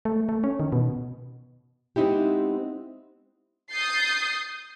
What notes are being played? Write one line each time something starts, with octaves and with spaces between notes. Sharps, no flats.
A3
A3
C#4
D#3
B2
G#3 B3 C4 D#4 E4 G4
D#6 G6 A6 C7